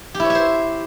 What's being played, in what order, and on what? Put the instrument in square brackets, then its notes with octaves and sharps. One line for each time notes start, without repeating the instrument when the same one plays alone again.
[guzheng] G4
E4
C#5
E5
C5